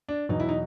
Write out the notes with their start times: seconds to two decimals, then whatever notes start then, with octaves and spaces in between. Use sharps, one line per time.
0.09 D4
0.29 E2 B2 F#3 D#4
0.40 E4
0.49 D#4